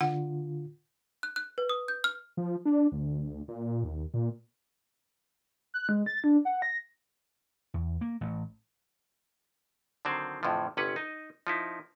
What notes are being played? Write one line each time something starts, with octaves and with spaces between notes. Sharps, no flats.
D3 F4 F#5
F#6
F#6
B4
D#6
G6
F6
F3
D4
D2
A#2
D#2
A#2
F#6
G#3
A6
D4
F#5
A#6
E2
A#3
A1
D3 D#3 F#3 C4 C5
F2 A2 D3 E3 F3
G1 C3 C#4 B4 F#5
D#4 D#5
F3 D#4 E4